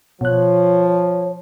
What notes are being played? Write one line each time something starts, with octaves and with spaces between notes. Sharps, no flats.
B2 F3 C#5 F#6